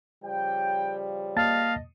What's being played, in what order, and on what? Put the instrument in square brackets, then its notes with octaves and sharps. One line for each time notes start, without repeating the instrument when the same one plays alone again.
[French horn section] C#3 F3 G3 [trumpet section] G5
[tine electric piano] A#3 A5 A6 [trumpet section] D#5 [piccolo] F5